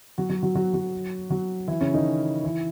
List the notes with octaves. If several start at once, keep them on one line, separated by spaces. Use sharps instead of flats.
F#3 F#4
F#3 F#4
F#3 F#4
F#3 F#4
F#3 F#4
F#3 F#4
E3 E4
C#3 C#4
D#3 D#4
E3 E4